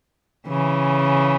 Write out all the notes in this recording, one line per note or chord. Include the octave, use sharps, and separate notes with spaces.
C#3 E3